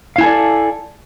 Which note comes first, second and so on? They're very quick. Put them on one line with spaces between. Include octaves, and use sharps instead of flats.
F5 E4 G#5 A4 D5